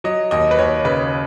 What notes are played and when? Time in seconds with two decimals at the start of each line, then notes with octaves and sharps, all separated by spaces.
0.04 F#3 D#5
0.31 D#2 D#5
0.51 B4
0.58 D#2 C#5
0.85 C#3 B4